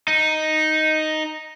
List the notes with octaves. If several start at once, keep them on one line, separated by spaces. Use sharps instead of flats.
D#4